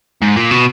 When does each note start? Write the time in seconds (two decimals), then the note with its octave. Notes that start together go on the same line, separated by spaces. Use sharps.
0.22 G#2
0.36 A#2
0.51 B2